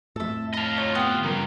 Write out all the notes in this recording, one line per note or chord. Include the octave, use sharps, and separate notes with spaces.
F2 A2 A4 E5
D#5 F5 A5 B5
D2 D#4 F4 C#5
B3 G4 G5
G2 C#3 E3 F3 A#4